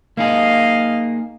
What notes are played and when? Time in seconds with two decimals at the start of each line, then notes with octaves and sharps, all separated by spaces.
0.17 A#3 D#4 G#4 D#5 F5